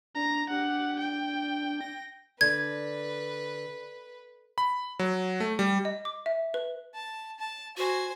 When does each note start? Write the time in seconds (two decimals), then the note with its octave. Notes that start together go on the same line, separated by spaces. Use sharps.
0.15 D4 A#5
0.50 D4 G4 F#5
0.99 G5
1.81 A#6
2.41 D3 B4 G#6
4.58 B5
4.99 F#3
5.40 A3
5.59 G3
5.85 D#5
6.05 D6
6.26 E5
6.54 B4
6.95 A5
7.40 A5
7.77 F#4 C5 G#5